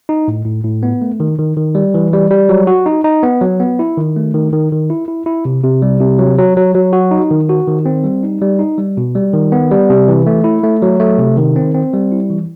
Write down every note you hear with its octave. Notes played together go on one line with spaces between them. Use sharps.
D#4
A2
A2
A2
B3
A3
D#3
D#3
D#3
G3
E3
G3
G3
F#3
F#4
D#4
D#4
B3
F#3
B3
E4
D#3
A3
D#3
D#3
D#3
E4
E4
E4
C3
C3
G3
C3
F#3
F#3
F#3
F#3
F#4
D#4
D#3
F#4
D#3
C4
G3
D#4
G3
D#4
G3
B2
G3
D#3
B3
G3
C3
E3
A3
E4
A3
F#3
A3
C3
D#3
C4
C4
G3
E4
E3